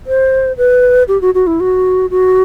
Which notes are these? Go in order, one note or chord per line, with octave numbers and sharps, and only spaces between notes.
C5
B4
G4
F#4
F#4
E4
F#4
F#4